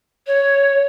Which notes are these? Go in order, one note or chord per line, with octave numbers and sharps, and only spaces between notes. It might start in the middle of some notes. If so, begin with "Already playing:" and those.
C#5